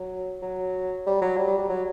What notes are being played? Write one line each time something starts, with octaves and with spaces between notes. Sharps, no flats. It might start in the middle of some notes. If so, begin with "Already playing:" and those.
Already playing: F#3
F#3
G3
F#3
G3
G3
G3
F#3